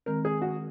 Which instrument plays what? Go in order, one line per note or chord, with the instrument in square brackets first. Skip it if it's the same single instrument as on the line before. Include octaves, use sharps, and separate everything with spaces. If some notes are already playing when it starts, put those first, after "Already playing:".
[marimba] D#3 G#3 C4 [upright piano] A#4
[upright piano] G#4
F#4